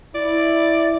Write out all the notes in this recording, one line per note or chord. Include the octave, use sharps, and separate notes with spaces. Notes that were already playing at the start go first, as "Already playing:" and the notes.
E4 D5